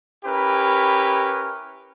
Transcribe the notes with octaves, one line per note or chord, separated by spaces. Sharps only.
C#4 E4 G4 A#4 B4